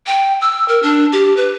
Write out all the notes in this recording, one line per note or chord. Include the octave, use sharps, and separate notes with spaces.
G5
E6
A#4
D4
G4
B4